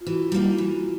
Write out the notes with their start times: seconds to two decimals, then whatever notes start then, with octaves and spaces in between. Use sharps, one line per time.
0.01 F4
0.06 E3 E4 F#4
0.32 G3 A#3 D#4
0.58 E3